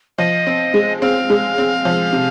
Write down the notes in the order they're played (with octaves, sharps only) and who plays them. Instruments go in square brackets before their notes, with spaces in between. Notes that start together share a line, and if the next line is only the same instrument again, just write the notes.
[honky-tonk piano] F3 [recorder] D#5
[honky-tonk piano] C4
G#3
[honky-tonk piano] C4 [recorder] F5
[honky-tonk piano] G#3
C4
F3
C3